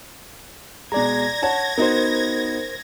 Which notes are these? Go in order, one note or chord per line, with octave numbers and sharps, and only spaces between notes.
B2 G#3 D5 A#5 G#6 A#6
C#5 F#5 A5
B3 D#4 F#4 A#4 C5